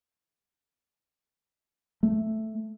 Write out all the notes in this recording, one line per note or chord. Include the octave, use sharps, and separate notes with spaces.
A3